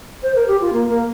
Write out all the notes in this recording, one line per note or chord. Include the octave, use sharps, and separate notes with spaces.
C5
A#4
G4
F4
A#3
A#3